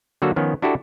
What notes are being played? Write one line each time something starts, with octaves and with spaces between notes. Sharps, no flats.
D3 F#3 A#3 F#4 A4
D#3 F3 B3 C#4
D4 E4 F#4 G4 A4